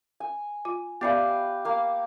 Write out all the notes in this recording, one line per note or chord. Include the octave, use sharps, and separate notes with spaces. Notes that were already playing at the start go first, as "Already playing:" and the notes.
G#5
F4
B3 G4 B4 D5 E5 F5
A#3 F5